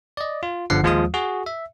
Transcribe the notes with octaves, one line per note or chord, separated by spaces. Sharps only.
D5 D#5
F4
G1 D3 F3 F#5 C7
D#2 F3 G#3 F4 F5 D#6
F#4 G#4
E5